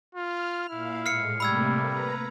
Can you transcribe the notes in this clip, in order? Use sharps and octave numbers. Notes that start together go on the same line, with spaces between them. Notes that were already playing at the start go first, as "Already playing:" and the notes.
F4 F6
A#2 E4 F5
A2 G#3 F6 C7 C#7
C3 G3 A3 A#3 B5 E6 G#6
B4 A#5